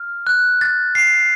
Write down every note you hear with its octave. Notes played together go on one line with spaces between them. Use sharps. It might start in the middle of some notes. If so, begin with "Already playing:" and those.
Already playing: F6
F#6
A6
C7